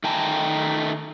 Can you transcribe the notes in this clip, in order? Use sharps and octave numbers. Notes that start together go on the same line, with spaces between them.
D#3 A3 G5 A5 A#5